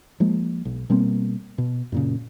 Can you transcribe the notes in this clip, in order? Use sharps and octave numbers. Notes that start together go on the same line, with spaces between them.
F3 G#3 A#3
B1
B2 G3 A#3 C4
B2
F#2 A#2 C#3